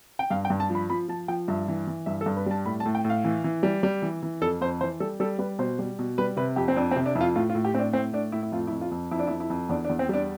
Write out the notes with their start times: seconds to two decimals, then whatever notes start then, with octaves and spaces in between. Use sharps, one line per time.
0.19 G5
0.30 G2 F5
0.45 G5
0.50 G2
0.60 A5
0.70 F3
0.75 B5
0.90 F3 B5
1.08 F3 A5
1.28 F3 G5
1.48 G2 E5
1.68 E3
1.87 E3
2.06 G2 E5
2.21 A4
2.26 G2
2.37 B4
2.46 G3 A5
2.66 A2 B5
2.80 A5
2.85 A2
2.95 G5
3.05 A2
3.10 F5
3.24 E3
3.44 E3
3.63 G3
3.83 G3
4.02 E3
4.23 E3
4.41 F2 A4
4.61 F2 C5
4.81 E3 C5
5.00 G3 A4
5.20 G3 A4
5.39 G3 B4
5.59 B2 C5
5.79 G3
5.99 B2
6.18 G3 B4
6.37 C3 B4
6.56 F2 G4
6.68 C4
6.76 F2 D4
6.91 C4
6.96 C3
7.06 D4
7.15 F2 E4
7.21 F4
7.36 A2 F4
7.50 F4
7.55 A2
7.65 G4
7.74 A2 C4
7.79 D4
7.93 A2 C4
8.13 A2 D4
8.32 A2 E4
8.43 E4
8.52 F2 F4
8.67 E4
8.72 F2
8.81 F4
8.91 F2
9.11 F2 E4
9.19 D4
9.27 E4
9.31 F2
9.40 E4
9.50 F2
9.69 E2 D4
9.85 D4
9.90 E2
9.99 C4
10.09 G3 D4